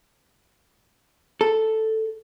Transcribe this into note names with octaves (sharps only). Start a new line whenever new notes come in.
A4